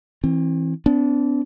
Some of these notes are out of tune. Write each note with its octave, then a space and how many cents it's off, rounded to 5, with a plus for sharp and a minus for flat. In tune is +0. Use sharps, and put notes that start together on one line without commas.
E3 -10 C4 +30
B3 +40 D4 -30